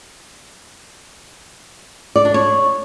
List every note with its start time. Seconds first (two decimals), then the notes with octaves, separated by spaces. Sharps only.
2.16 D5
2.25 D4
2.34 C#5